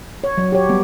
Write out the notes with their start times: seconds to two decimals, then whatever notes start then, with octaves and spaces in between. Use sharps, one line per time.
0.24 C#5
0.38 F#3
0.52 G4 C#5
0.69 G3 B3